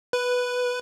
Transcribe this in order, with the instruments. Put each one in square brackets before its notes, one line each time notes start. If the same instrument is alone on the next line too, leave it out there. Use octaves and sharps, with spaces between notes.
[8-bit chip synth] B4